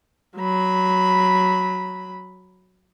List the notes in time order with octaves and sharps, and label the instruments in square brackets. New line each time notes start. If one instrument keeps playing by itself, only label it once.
[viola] F#3 B5